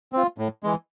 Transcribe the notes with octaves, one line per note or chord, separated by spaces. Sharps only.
C4 F4
A2
E3 G#3